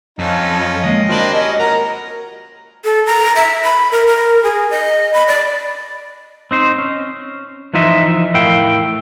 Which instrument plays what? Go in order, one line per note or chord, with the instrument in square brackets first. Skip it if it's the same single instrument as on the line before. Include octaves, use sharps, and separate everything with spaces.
[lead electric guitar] F2 [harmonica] C#4 D#4 F4
[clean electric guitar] D#3 G#3 A#3 [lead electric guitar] D#5
[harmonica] A#3 C4 D4 [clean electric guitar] F4 F#4 B5
[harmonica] G3 C#4
[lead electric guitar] A#4 [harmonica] F#5 A#5
[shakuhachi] A4
A#5
E5
B5
A#4
A#4
G#4
D#5
B5
D5
[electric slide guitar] C4 D#4 C5
C#4
E3 F3 D#4 F4 D#5 E5
A2 E4 A#4 F5 G5